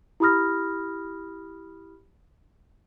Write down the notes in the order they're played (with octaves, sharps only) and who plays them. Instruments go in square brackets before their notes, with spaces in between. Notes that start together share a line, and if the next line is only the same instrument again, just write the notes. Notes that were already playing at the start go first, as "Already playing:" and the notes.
[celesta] E4 G4 B5 D#6 F6 A#6